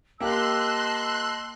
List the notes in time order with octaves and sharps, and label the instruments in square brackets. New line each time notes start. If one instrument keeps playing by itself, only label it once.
[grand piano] A#3 G4 F5 [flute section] D#5 A5 E6 [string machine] C6 F#6